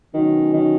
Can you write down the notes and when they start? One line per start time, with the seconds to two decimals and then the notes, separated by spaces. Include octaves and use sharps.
0.14 B2 D#3 F#3 C#4 F#4
0.53 D#3